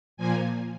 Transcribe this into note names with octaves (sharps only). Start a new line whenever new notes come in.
A#2 F3 A#3 G#5